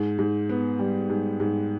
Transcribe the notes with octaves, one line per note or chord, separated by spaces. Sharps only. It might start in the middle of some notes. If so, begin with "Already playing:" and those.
Already playing: G#2
G#2
B3
G3
G#2
G#2